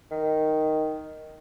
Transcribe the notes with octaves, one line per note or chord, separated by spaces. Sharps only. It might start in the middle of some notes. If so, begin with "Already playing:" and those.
D#3